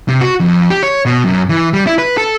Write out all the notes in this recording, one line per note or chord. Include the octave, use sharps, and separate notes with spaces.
C3
F#4
F2
G4
C#5
B2
F#2
E3
G3
E4
B4
A4